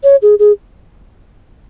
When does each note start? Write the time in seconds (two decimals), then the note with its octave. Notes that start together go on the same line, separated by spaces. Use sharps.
0.04 C#5
0.22 G#4
0.39 G#4